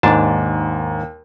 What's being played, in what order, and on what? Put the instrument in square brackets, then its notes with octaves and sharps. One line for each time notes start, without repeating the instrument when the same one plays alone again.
[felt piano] D#2 [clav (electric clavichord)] G#2 D4 A5